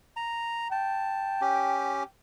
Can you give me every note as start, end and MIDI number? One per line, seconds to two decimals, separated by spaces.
0.17 0.68 82
0.72 2.07 79
0.72 1.41 81
1.41 2.03 61
1.41 2.03 67